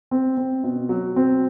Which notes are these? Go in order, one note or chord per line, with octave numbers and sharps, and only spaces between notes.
C4
C4
B2
F#3
C4